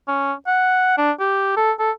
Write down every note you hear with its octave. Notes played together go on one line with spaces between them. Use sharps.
C#4
F#5
D4
G4
A4
A4